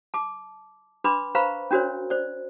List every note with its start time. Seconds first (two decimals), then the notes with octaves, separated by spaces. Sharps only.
0.14 A5 D6
1.04 D4 B4 B5 C6 D6
1.35 B4 C5 F5 A#5 B5 C#6
1.71 C#4 D4 F#4 A#4 C5 C#5
2.10 C5 D5